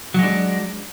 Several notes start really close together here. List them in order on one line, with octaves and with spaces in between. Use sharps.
F#3 G#3 D4